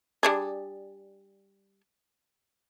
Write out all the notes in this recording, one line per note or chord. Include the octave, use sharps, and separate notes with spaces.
G3 D4 G#4